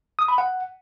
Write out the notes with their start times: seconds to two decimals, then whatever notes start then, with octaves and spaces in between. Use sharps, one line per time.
0.19 D#6
0.28 B5
0.38 F#5